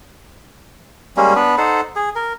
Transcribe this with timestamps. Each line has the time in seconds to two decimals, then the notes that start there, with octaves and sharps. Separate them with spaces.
1.17 G3 G#3 A#3 C#4
1.36 B3 D4 B4
1.58 D#4 A4 C5 F#5
1.96 G#4
2.15 A#4